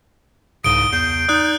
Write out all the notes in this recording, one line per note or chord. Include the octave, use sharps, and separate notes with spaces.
C2 G#2 C#3 D#6 D7 G7
E2 G6 C7
D#4 D5 D#6 F#6